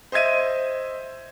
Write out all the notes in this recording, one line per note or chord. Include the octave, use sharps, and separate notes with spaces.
C5 D#5 E5 G#6 D#7